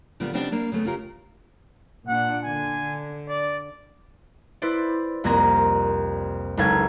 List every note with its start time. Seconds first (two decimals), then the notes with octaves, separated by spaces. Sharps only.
0.20 A#2 D3 G3 B3 F4
0.33 C#3 G3 B3 C4 D4 D#4
0.52 G3 A#3 D4
0.72 C#3 A3 B3
0.85 C#3 F4 G4 A#4
2.08 A#2 D4 F#5
2.44 D3 G#5
3.28 D5
4.62 E4 B4 C5 D5
5.24 C2 F2 A#3 C4 A#6
6.57 F#1 C#2 D#4 A4 F5 G#6